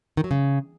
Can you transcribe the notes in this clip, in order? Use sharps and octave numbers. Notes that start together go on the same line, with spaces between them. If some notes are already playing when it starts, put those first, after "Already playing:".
D#3
F#3
C#3